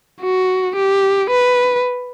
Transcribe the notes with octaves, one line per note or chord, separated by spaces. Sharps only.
F#4
G4
B4